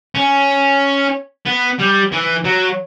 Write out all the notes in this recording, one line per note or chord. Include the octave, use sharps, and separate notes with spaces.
C#4
B3
G3
E3
F#3